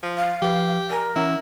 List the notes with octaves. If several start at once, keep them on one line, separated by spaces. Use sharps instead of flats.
F3
F5
F3 G4 B4
A#4 D5 G#5
E3 C#4 E4 F#5